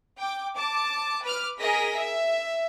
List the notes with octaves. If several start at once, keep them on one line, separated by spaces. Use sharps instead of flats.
G5 D6
A5 D6
B4 D6 F6
G#4 A#4 D#5 A#6 B6
E5